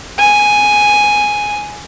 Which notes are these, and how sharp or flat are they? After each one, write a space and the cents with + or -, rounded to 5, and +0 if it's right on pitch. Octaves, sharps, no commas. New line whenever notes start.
G#5 +0